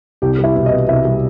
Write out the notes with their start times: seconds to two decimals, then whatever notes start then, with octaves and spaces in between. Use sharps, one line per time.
0.22 C2 G4
0.39 G3 E4
0.56 B2
0.66 D#5
0.71 B3
0.88 C2 E5
1.05 G3